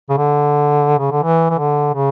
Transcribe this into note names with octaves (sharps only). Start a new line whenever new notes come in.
C#3
D3
C#3
D3
E3
E3
D3
C#3